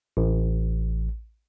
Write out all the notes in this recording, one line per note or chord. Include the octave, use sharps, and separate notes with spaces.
A1